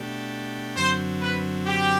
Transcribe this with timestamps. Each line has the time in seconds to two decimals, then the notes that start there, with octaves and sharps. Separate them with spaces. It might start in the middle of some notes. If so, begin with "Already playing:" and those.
Already playing: B2 A3 D4 G4
0.76 F#2 D3 F#3 C4 C5
1.22 B4
1.66 G4